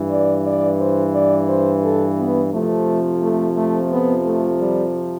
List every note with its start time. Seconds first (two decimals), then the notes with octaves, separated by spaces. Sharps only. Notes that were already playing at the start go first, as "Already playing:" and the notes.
Already playing: G2 E3
0.11 D5
0.47 D5
0.81 C5
1.15 D5
1.49 C5
1.84 A4
2.19 B3
2.53 F2 C3 F3 A3
3.23 A3
3.57 A3
3.92 B3
4.25 A3
4.61 G3